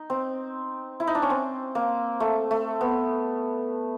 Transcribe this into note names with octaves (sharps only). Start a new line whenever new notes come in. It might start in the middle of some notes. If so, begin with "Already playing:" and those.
Already playing: D#4
C4
E4
D#4
D4
C#4
C4
A#3
A3
A3
B3